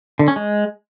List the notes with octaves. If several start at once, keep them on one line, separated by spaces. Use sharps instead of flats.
D3
C#4
G#3